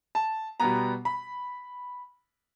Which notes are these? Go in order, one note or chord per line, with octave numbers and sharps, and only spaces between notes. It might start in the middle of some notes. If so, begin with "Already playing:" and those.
A5
B2 G3 B3 A#5
B5